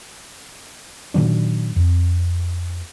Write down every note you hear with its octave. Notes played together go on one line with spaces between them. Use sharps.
A#2 D#3 F#3 D4
F2